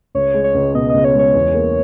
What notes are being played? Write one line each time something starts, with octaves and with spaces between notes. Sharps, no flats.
C#2 C#5
G#3
C#5
C#2
B2 D#5
C#2 D#5
C#5
G#3
C#5
E2
A#3